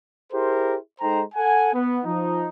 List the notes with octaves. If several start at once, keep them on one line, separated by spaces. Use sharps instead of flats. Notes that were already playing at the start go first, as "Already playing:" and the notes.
E4 G4 G#4 A#4 C5
G#3 D#4 A4 C5 G5 A#5
A4 F#5 G#5
B3
F3 D#4